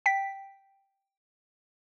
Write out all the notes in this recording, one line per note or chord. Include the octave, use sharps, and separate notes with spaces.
G5 B6